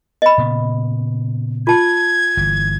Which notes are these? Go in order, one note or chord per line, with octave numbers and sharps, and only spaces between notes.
D#5 B5
A#2 C#3 B3
F4 A5 G#6
G1 E3